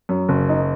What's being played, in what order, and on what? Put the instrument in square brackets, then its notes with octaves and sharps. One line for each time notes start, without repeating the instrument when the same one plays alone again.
[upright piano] F#2
F#1
D#4